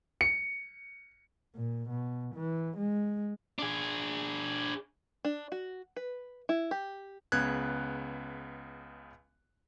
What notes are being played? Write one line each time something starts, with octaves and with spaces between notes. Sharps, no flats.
C#7
A#2
B2
E3
G#3
D4 G#4
D4
F#4
B4
E4
G4
C#2 C#3 B3 F#6 G#6